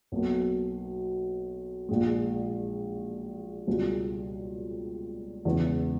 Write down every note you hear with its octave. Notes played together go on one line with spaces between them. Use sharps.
B1 B2 A#3
A#1 A#2 G#3
C#2 B2 G3
E2 C#3 E3 G#3